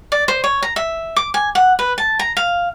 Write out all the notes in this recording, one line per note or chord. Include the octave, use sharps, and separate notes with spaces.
D5
C5
C#5
A#5
E5
D6
G#5
F#5
B4
A5
A#5
F5